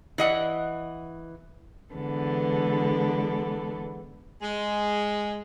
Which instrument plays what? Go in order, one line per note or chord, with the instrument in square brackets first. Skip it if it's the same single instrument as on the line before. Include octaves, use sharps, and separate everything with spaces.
[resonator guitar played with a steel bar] E3 D#5 F#5
[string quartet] D3 E3 G#3 B3 A4
[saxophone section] G#3